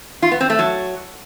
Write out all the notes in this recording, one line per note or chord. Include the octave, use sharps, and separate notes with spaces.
F4
B3
C4
A3
F#3